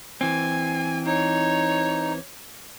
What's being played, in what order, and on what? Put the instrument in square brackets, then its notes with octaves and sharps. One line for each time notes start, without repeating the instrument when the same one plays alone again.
[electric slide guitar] E3 C4 [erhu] G#5
[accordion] D#4 [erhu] C#5